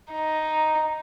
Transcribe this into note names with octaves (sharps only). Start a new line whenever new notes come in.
D#4